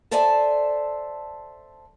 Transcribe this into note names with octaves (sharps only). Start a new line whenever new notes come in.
A4 C5 D5 E5 G#5 A5